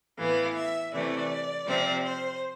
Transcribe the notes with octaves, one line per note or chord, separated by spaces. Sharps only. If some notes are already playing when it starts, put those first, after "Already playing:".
A2 E3 B3 F5
E5
C3 E3 A3 D5
C3 F3 C4
C5